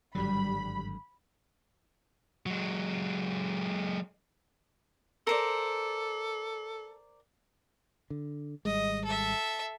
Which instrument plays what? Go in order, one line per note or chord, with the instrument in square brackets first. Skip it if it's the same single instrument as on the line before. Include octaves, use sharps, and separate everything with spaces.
[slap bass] G#1 G2 D3 [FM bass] F#3 [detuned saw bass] G3 [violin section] B5
[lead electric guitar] F#3 G#3
[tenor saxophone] A4 [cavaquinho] A#4 C5 D5
[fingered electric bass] D3
[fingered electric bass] G#1 G3 G#3 [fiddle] D#5
[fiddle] A4 E5